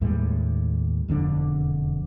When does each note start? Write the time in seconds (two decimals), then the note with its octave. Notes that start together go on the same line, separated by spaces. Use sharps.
0.01 D#2 A2 G3 G#3
1.08 E1 F2 D3 D4